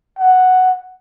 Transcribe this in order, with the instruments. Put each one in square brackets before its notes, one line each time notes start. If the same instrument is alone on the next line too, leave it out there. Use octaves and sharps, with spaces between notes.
[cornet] F#5